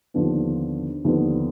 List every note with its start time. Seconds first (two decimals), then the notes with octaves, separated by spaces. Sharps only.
0.14 D#2 D3 F3 B3 D4
1.05 D#2 D3 F3 B3 D4